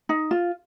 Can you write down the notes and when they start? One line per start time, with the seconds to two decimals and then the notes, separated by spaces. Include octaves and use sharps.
0.09 D#4
0.31 F4